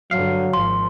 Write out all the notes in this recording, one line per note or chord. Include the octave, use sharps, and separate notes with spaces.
G2 D3 F#3 F5
G#1 F3 C6